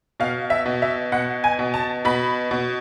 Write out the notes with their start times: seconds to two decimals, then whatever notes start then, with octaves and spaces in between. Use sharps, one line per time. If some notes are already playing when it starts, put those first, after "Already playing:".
0.20 B2 F5
0.50 E5
0.66 B2
0.82 E5
1.12 B2 F#5
1.44 G#5
1.59 B2
1.74 A5
2.05 B2 B5
2.51 B2